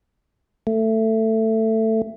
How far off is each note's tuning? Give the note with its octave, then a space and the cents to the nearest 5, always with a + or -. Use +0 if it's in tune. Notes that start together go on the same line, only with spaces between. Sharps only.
A3 +15